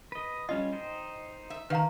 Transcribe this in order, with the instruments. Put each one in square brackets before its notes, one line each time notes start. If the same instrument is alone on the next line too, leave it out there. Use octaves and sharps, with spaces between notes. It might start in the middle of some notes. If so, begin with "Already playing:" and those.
[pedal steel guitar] B4 D#5
[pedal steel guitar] G3 C#4 F4 [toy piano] D#5
[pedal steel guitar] D#4 C5 G5
[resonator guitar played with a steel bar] E5
[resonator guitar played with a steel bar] D#3 [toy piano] B4 F5 A#5